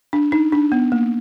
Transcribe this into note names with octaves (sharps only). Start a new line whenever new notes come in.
D4
D#4
D4
B3
A#3